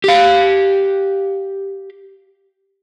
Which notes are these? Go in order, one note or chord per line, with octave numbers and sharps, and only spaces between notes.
G4 F5